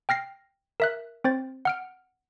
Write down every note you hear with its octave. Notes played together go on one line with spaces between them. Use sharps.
G5 F6 A#6 C7
A#4 E5 F#6
C4 C5 A6
F#5 F6 D7